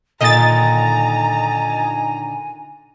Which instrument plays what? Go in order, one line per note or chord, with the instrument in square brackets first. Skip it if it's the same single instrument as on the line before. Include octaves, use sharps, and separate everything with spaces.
[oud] A#2 D3 D#3 [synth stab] D#5 A6 [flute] G#5 [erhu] A#5